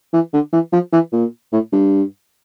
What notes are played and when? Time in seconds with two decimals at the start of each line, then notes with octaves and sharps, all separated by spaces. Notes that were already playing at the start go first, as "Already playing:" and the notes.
0.13 E3
0.33 D3
0.53 E3
0.73 F3
0.93 E3
1.12 A#2
1.53 A2
1.72 G2